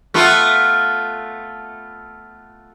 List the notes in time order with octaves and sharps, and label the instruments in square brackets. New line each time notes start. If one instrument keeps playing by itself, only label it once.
[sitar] A3 B3 F4